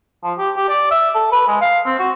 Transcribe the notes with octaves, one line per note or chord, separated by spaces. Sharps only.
F3
G4
G4
D5
E5
A4
B4
G#3
F5
C4
F#4